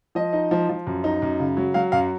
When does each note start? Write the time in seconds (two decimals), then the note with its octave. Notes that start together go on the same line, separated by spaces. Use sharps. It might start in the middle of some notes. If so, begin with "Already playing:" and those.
0.15 F3 D#5
0.33 D#4
0.51 F3
0.69 F3
0.87 F#2
1.04 D#4
1.22 F#2
1.40 C#3
1.57 F#3
1.74 F#3 F5
1.92 F#2 F5